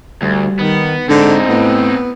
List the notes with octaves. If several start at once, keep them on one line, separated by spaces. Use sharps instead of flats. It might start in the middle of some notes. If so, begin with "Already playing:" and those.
D2 G3
D#3 B3
G#2 D3 C4 D#4
A2 B3